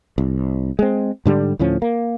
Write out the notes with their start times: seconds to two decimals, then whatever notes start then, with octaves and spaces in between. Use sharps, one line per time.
0.18 C2
0.79 G#3 C4
1.25 G#2 D3 G3
1.59 D2 A2 F3 C#4
1.82 A#3